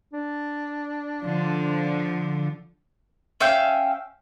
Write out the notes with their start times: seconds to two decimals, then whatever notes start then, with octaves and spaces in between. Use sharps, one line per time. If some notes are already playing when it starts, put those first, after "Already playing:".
0.13 D4
1.22 D3 F3
3.40 C#4 E5 F5 G5